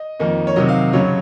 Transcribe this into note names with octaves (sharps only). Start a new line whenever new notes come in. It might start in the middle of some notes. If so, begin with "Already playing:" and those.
Already playing: D#5
F2 D#3 A#3 D#4
C#5
C3 D#3 F#3 D#5
F5
F#2 C#3 F#3 C#5